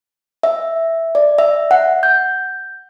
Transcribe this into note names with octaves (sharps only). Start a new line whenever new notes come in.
E5
D5
E5
F#5
G6